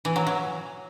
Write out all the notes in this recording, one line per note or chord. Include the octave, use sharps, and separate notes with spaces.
E3
F#3
F#3